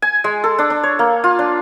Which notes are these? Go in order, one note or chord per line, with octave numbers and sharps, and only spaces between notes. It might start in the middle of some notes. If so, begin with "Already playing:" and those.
G#5
G#3
A4
D4
D4
C#5
A#3
F4
D4